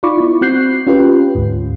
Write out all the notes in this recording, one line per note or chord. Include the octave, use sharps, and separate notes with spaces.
D#4 F4 D5 B5 C#6 D6
B3 E4
C4 F#4 F#6 G6 C7
C#4 F4 G4 B4
D2 G#2